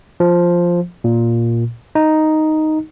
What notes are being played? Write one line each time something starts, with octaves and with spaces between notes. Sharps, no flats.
F3
A#2
D#4